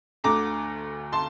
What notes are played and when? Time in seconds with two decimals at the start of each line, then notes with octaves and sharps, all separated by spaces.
0.24 D2 D3 A3 A#5 D6
1.12 A5 C6